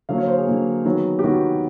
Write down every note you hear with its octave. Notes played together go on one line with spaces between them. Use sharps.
D3 F#3 A#3 F5
C#5
C5
G#4
D3 F#3 A#3
D#3 F#3 B3
G4
D#3 F#3 B3 F#4